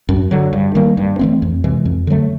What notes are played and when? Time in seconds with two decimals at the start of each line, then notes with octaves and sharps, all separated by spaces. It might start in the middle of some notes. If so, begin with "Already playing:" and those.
0.09 F#2
0.31 D3 F#3
0.53 G2
0.75 D#3 G3 A#3
0.97 G2
1.19 E3 A3 C4
1.42 F2
1.64 C3 E3 G#3
1.85 F2
2.07 D3 F#3 A3